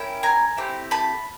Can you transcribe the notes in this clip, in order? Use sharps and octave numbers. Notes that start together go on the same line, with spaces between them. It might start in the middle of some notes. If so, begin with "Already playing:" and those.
Already playing: A#3 C#4 E4 G5
G#5 A#5
A3 C4 E4 G4
A5 B5